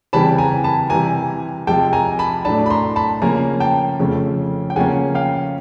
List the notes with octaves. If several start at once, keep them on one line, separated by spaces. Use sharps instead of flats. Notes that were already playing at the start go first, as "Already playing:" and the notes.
C#3 E3 G3 C4 A5 B5
G#5 A#5
A5 B5
C3 E3 G3 G#5 A#5
C3 F3 G#3 G5 A5
G#5 A#5
A5 B5
A2 F#3 A3 D4 A5 B5
B5
A#5 C6
A5 B5
C#3 F3 A#3 C#4 G#5 A#5
G5 A5
F2 C#3 F3 A3 C#4
G5
C#3 F3 A#3 C#4 F#5 G#5
F5 G5